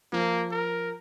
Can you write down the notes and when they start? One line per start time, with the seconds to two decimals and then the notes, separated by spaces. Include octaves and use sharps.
0.13 F3 A#3
0.51 A#4